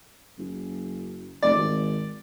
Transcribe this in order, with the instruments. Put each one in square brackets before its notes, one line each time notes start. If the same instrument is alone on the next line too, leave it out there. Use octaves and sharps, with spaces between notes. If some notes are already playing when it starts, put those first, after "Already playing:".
[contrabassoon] F#1
[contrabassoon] F1 [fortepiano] D5
[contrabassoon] G#1